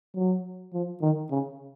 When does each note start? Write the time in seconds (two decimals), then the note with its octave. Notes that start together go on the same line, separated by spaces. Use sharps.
0.15 F#3
0.73 F3
1.02 D#3
1.31 C#3